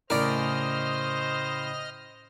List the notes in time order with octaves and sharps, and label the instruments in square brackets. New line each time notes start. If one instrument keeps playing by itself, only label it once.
[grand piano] A2 C#3 [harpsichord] A#4 D5 [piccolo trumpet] C5 [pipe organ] D#5 F6